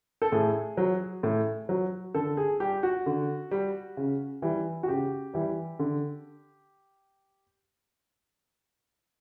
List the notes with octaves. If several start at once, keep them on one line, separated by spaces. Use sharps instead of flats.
A4
A2 G#4
F#3
A2
F#3
D3 A4
G#4
G3 G4
F#4
D3
G3
C#3
E3 G3
F#4
C#3 G4
E3 G3
D3